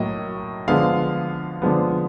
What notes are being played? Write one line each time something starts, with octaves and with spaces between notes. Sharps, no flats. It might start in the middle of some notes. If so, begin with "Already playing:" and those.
Already playing: A2 F#3 A#3 D#5
D3 F3 G#3 B3 F5
D3 F3 G#3 B3